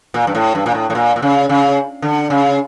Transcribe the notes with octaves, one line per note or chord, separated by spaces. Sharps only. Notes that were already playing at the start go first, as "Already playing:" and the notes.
A#2
G2
A2
G2
A#2
A2
A2
A#2
A#2
C#3
C#3
D3
C#3